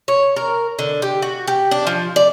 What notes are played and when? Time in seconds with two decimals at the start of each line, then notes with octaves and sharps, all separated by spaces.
0.08 C#5
0.36 A#4
0.79 D3
1.02 G4
1.22 F#4
1.48 G4
1.71 D4
1.87 F3
2.16 D5